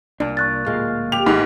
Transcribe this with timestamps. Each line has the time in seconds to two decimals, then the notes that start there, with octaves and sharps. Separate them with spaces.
0.20 C2 A#2 D4
0.37 C#6 F#6 A6
0.66 D1 A#2 G#3 F5
1.12 G4 F7
1.26 G#1 G#2 E3 B3